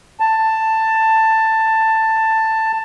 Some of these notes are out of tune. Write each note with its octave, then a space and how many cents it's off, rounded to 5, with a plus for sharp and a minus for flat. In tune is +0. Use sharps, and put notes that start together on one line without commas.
A5 +10